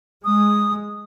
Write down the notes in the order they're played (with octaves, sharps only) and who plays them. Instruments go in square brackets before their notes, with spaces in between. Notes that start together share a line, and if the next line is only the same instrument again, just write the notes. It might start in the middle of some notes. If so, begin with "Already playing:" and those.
[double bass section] G#3 [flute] D#6